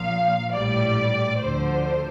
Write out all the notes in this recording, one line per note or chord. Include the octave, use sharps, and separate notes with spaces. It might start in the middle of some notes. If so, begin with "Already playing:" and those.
Already playing: A#1 A#2 F3 F5
A#1 A2 G3 D5
D2 D3 F3 C5